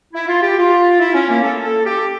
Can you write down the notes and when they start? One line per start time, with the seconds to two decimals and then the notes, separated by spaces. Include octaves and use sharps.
0.13 E4
0.28 F4
0.42 G4
0.57 F4
0.99 E4
1.14 C#4
1.28 A#3
1.42 A4
1.63 A4
1.85 G4